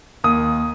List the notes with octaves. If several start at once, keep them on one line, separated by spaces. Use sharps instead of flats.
D#2 D#6